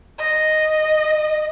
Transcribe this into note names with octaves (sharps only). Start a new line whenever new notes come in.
D#5